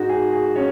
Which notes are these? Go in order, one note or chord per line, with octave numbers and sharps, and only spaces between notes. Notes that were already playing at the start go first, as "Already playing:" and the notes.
Already playing: G#2 G#3 D#4 F#4
G#4
G#4
C#4 D#4 C#5